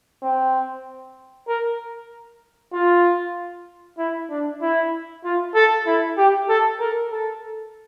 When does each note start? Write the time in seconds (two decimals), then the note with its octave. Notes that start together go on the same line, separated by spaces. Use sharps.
0.23 C4
1.48 A#4
2.73 F4
3.98 E4
4.30 D4
4.62 E4
5.25 F4
5.55 A4
5.87 E4
6.18 G4
6.49 A4
6.80 A#4
7.12 A4